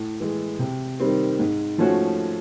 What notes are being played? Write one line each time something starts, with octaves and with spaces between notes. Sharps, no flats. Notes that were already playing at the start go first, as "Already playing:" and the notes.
Already playing: A2
E3 G#3
C3
D#3 G3 C4
G#2
F3 A3 C#4 F#4